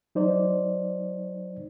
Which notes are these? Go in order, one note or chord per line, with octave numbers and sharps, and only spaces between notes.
F#3 D#4 C5 D5